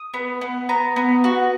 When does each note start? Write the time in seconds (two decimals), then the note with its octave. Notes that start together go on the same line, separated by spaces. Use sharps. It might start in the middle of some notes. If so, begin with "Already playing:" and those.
Already playing: D#6
0.14 B3
0.41 B3
0.69 B3 A#5
0.96 B3
1.24 F#4